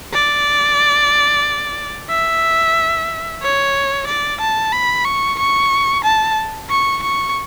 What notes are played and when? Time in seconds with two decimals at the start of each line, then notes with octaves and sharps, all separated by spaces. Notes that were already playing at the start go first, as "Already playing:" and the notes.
0.13 D5
2.10 E5
3.42 C#5
4.07 D5
4.41 A5
4.72 B5
5.05 C#6
5.39 C#6
6.04 A5
6.70 C#6
7.03 C#6